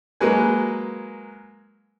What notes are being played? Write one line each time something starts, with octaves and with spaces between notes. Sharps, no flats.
F#3 G#3 A#3 B4 G#5